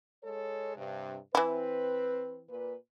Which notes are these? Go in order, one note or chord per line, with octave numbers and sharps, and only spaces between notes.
G#3 A4 C#5
G2 C3
E3 C4 E4 B4
A#2 B4